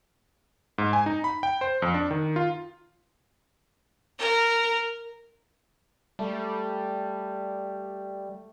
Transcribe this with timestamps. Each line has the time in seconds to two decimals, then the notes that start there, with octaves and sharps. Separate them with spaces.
0.78 G#2
0.93 G#5
1.06 D#4
1.24 B5
1.43 G5
1.61 C5
1.82 F2
1.94 D4
2.11 D#3
2.36 F4
4.19 A#4
6.19 G3 A3